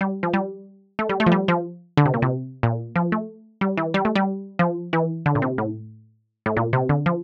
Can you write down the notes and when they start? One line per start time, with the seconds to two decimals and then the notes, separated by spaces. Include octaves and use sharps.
0.01 G3
0.23 F3
0.34 G3
0.99 A3
1.09 G3
1.20 A3
1.26 F3
1.32 G3
1.48 F3
1.97 D3
2.06 C3
2.14 A#2
2.22 C3
2.63 A#2
2.96 F3
3.12 A3
3.61 G3
3.77 E3
3.94 G3
4.05 A3
4.16 G3
4.59 F3
4.93 E3
5.26 D3
5.35 A#2
5.42 C3
5.58 A2
6.46 A2
6.57 A#2
6.73 C3
6.89 D3
7.06 F3